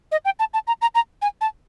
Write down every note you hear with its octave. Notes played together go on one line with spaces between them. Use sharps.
D#5
G5
A5
A5
A#5
A#5
A#5
G#5
A5